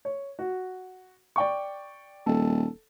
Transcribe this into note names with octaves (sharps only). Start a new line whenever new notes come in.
C#5
F#4
D5 G5 C#6
D#1 A4